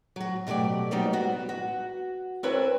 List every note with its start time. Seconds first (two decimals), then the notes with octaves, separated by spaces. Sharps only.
0.16 F#3 F#4
0.47 B2 F#3 A3 G4 D5
0.91 F#3 G3 A#3 B3 D#4
1.13 B3 F#4
1.49 F#4
2.43 C4 D4 E4 A#4 B4 C#5